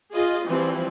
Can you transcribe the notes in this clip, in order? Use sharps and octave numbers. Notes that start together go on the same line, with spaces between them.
F4 G#4 D#5
E3 F3 G3 C4